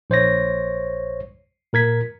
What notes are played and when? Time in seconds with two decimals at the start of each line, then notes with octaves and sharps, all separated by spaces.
0.10 A#1 C5 C#5 A#6
1.73 A#2 A#4 G#6 B6